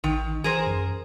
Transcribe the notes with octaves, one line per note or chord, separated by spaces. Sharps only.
A1 D#3
E3 G#4 A#4 C5
F#2